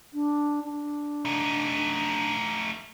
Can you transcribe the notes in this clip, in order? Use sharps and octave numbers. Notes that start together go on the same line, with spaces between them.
D4
D4
A3 D#4